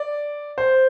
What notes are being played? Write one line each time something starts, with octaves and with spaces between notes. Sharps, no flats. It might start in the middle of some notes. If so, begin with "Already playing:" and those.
Already playing: D5
C5